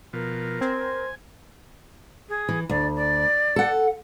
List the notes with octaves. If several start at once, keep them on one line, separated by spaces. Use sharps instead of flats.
B2 F3 A#4
C4 C5 G#5
G#4
E3
D2 D5
D5
A4 F#5